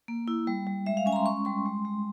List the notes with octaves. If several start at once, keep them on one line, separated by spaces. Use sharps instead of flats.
A#3
E4
G3
G3
G#3 E5
F5
C#4 G#5
A#5
C6
C#4 C#6
G3 C6
G#3
G#3